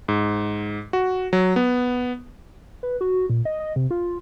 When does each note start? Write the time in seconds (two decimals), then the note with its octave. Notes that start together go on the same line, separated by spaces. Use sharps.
0.08 G#2
0.93 F#4
1.33 F#3
1.56 B3
2.83 B4
3.01 F#4
3.30 A#2
3.45 D#5
3.60 D#5
3.76 C3
3.91 F4